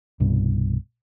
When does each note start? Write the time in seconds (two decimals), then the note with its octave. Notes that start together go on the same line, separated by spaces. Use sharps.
0.20 C2 G2 B2